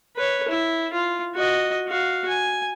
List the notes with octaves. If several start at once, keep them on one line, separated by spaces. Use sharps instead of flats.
B4 C#5
E4
F4
F#4 D#5
F#4 F5
G#5